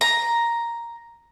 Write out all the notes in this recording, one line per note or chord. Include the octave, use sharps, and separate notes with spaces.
A#5